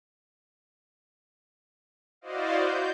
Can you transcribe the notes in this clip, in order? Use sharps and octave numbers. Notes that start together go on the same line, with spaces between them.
E4 F#4 C5 D5 D#5 F5
G6